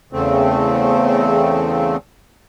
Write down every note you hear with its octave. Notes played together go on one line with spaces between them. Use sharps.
E2 C#3 A3 C4